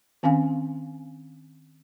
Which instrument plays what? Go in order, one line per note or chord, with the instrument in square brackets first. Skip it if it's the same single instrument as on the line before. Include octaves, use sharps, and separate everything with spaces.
[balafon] D#3 C4 C#4 F5 G#5